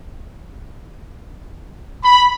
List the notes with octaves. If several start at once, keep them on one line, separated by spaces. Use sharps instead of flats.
B5